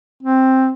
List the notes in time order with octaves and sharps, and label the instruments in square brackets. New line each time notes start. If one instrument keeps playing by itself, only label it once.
[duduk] C4